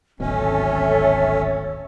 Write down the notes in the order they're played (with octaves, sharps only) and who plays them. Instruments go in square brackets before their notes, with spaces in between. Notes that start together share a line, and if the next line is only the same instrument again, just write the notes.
[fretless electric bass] D1 G#1 B2 [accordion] C#4 [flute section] A4 C#5 E5